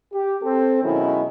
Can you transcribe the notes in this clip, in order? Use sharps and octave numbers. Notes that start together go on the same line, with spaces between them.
G4
C4 A4
B2 D#3 F#3 G#3 C#4 E4